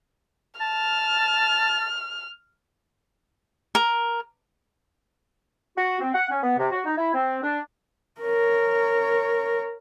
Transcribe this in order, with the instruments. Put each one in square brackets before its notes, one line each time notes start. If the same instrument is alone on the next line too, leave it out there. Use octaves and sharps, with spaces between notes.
[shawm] A5 [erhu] F6
[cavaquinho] A#4
[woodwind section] F#4
C4
F#5
C#4
B3
C3
F#4
D#4
E4
C4
D4
[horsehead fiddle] A#4 C#5